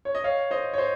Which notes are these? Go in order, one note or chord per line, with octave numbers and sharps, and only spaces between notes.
C#5
D#5
C#5 F5
C5 D#5
C#5
C5 D#5